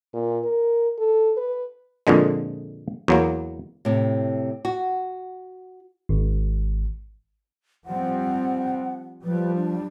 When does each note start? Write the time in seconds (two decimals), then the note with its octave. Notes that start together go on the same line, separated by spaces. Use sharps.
0.14 A#2
0.44 A#4
0.99 A4
1.37 B4
2.07 F2 A#2 D3 G#3
3.08 E2 F#3 A#3
3.85 A2 C3
4.65 F#4
6.09 G#1
7.86 F3 G3 C4 F#5
9.24 F3 G3 B4
9.55 D4